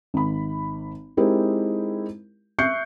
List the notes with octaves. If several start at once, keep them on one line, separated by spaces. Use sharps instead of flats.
G#1 B5
G#3 C4 D#4 E4 G4 A#4
E5 C#6 F#6 G6 C7 C#7